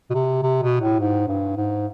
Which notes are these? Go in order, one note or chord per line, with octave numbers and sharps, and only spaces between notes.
B2
C3
C3
B2
A2
G#2
G2
G#2